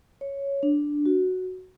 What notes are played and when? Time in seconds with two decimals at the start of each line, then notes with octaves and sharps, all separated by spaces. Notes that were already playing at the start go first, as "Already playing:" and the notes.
0.21 C#5
0.63 D4
1.06 F#4